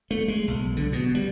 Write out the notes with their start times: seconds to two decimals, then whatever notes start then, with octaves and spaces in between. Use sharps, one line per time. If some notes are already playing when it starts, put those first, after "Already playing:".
0.11 A3
0.28 G#3
0.48 B1
0.77 D3
0.93 B2
1.15 G3